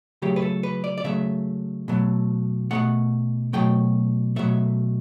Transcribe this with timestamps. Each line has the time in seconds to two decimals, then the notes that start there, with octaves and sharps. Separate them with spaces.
0.22 C#3 F#3 A3 G4
0.36 B4
0.42 A4
0.63 B4
0.84 D5
0.98 D5
1.04 C#3 F#3 A3 E5
1.88 B2 F#3 A3
2.71 B2 F#3 A3 F#5
3.53 B2 F#3 A3 G5
4.36 B2 F#3 A3 E5